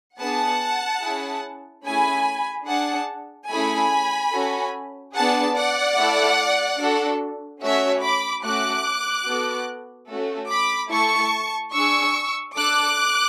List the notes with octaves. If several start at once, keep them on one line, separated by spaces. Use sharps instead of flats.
B3 D4 G#4 F#5 A5
C#4 E4 G#4
A3 C#4 E4 G#4 G#5 B5
D4 G#4 F#5 A5
A3 C#4 E4 G#4 G#5 B5
C#4 F#4 A4
B3 D4 G#4 F#5 A5
D5 F#5
A3 E4 A4
D4 F#4 A4
A3 C#4 F#4 C#5 E5
B5 D6
A3 C#4 F#4 D6 F#6
B3 F#4 A4
A3 C#4 F#4 A4
B5 D6
A3 E4 A4 A5 C#6
D4 G#4 C#6 E6
D4 A4 D6 F#6